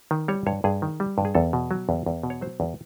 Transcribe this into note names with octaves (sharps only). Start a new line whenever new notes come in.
D#3
G3 C#5
G2 C#5
G2 G#4
D#3
G3
G2
G#4
E2 A4
B2
F#3
E2
E2
B2
C#5
F#3 C5
E2